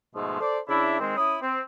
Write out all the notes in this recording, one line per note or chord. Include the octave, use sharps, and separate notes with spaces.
G#2 B2 F3 G#3 A3
A4 C5 D5
C#3 D4 E4
D#3 G#3 C4
C#4 E4 B5 D#6
C4